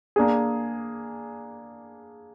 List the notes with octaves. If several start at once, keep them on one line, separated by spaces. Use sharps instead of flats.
A#3 D4 G#4